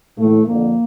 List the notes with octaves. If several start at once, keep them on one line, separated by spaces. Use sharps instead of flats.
A2 E3 A3
F2 D3 F3 A#3